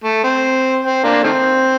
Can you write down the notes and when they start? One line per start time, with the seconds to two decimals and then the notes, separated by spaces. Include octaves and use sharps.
0.04 A3
0.24 C4
0.84 C4
1.04 A#3 D4
1.24 D#3 A3 C4